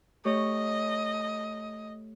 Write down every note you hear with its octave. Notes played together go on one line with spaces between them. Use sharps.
A3 G4 C#5 D#5